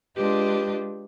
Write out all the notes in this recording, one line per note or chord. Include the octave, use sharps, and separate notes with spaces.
G#3 D4 F4 G4 B4 D#5